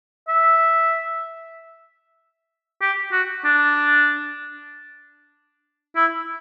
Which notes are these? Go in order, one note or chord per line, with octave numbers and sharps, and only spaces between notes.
E5
G4
F#4
D4
E4